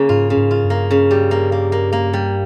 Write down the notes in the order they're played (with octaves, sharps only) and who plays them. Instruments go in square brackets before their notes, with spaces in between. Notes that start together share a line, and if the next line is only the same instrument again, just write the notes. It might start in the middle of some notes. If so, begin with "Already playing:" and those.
Already playing: [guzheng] C#3 A#3
[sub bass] G#2 [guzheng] F4
[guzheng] C#3
[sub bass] G#2
[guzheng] F4
[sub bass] G2
[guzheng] A#3
C#3
G3
A#3
A#3
A#3
A#3
G3